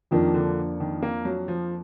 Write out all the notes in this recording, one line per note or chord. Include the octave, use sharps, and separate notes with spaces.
F2 D#3 F3 A#3 D4
D3
D#3
A#3
F#3
F3